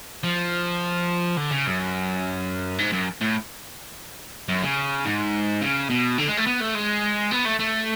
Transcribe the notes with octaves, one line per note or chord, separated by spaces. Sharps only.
F3
D3
C#3
F#2
G#2
F#2
A2
F#2
C#3
G#2
C#3
B2
D3
G#3
A3
B3
A3
G#3
B3
A3
A3